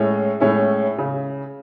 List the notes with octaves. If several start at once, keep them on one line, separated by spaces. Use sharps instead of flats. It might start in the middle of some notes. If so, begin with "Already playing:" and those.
Already playing: A2 G#3 C#4 E4
A2 G#3 C#4 E4
C#3